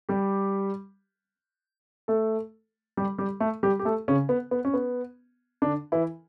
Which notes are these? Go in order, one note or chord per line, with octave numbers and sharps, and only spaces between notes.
G3 G4
A3 A4
G3 G4
G3 G4
A3 A4
G3 G4
G4
A3 A4
C#3 C#4
B3
B3
C#4
B3
D3 D4
E3 E4